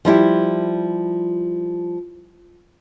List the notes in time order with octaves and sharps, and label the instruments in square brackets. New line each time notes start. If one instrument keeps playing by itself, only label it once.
[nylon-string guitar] F3 G3 E4 G4